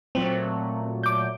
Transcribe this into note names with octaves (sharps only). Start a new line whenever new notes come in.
A#2 F#3 A3 C4
D6 G6